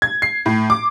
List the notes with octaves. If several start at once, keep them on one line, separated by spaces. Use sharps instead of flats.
G#6
C7
A2
D6